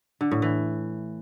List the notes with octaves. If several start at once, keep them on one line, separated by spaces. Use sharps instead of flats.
D3
A2
E3